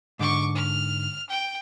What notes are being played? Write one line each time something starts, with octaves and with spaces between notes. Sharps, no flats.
G#2 D3 C#6 D6
F6
G5